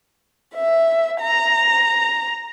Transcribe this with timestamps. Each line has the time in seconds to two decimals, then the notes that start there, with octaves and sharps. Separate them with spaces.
0.55 E5
1.21 A#5